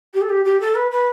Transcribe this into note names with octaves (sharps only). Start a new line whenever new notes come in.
G4
A4
G4
G4
A4
B4
B4